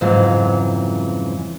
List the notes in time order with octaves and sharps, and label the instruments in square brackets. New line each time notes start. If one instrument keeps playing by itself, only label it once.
[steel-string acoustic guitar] F2 G#2 C#3 E3 F#3